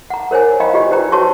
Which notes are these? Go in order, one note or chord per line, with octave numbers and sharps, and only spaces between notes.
F#5 A#5
A#4 C5 C#5 G#5
D#5 F5 G5 A#5 B5
F4 G4 D5 D#5
D#4 B4 C5 G5 A#5
F#4 B4 C#5 A5 C6 C#6